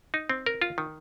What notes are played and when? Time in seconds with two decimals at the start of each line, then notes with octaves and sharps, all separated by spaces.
0.14 D#4
0.29 C4
0.46 A#4
0.62 F4
0.78 D#3